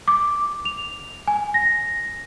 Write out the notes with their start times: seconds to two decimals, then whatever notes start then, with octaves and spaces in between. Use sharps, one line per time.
0.08 D6
0.65 F7
1.28 G#5
1.54 A#6